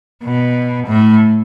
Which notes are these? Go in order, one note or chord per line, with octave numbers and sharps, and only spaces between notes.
B2
A2